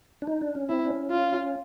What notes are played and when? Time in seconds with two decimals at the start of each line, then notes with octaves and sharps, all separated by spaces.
0.22 D4
0.27 D#4
0.41 D4
0.55 C#4
0.69 C4 E4
0.85 D4
0.90 C#4
1.10 F4